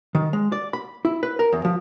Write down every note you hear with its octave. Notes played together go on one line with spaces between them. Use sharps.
D#3
G#3
D5
B5
E4
B4
A#4
E2
F3